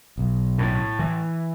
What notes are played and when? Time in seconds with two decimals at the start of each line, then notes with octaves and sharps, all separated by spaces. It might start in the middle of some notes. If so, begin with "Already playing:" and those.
0.18 B1
0.59 A2
0.99 E3